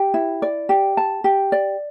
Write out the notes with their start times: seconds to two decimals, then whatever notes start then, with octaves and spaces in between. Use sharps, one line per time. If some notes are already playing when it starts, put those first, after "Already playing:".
Already playing: G4
0.14 E4
0.42 D5
0.69 G4
0.97 A5
1.24 G4
1.52 D5